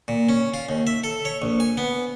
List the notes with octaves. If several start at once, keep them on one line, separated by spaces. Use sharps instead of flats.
A#2
C#4
F4
D#2
E5
A4
C#5
A#1
G#5
B3